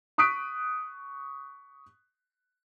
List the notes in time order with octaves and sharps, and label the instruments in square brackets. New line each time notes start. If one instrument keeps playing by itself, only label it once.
[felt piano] C#6 D#6 F#6 B6 D7